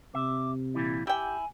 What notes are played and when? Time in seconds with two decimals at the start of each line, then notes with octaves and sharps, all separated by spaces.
0.15 C3 E5 D6
0.74 A#2 E3 G3 E4
1.07 E4 G4 G5 G#5